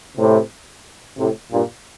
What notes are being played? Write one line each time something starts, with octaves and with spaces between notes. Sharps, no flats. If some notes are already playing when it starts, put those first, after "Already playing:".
A2 C3
A2 C3
G2 A#2